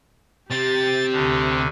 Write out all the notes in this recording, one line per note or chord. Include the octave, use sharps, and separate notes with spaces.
C3 C4 G4 A6
D2 D3